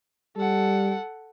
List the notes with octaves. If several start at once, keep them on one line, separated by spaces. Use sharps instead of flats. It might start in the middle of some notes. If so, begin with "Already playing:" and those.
G3 A4 F#5